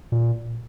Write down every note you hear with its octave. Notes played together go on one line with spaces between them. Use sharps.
A#2